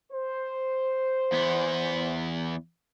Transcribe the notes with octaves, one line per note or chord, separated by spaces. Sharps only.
C5
E2 B3